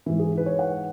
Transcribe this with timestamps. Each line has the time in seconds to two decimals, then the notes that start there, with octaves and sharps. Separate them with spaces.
0.06 G#2 E3 E4
0.19 G#4
0.37 B4
0.46 C#5
0.59 F#5